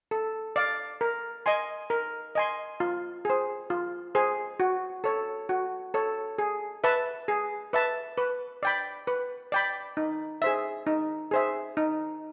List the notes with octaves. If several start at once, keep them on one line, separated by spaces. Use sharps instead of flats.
A4
D5 F5
A#4
D#5 G#5 C6
A#4
D#5 G#5 C6
F4
G#4 C5
F4
G#4 C5
F#4
A4 C#5
F#4
A4 C#5
G#4
B4 E5 A5
G#4
B4 E5 A5
B4
D5 G5 B5
B4
D5 G5 B5
D#4
G#4 C5 E5
D#4
G#4 C5 E5
D#4